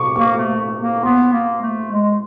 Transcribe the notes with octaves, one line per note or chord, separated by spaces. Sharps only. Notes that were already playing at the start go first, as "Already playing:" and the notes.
Already playing: C#6 D6
A#3 C#6
A3
A#3
B3 C6
A#3
A3
G#3